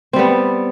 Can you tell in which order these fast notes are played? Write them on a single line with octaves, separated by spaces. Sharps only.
C4 G3 B3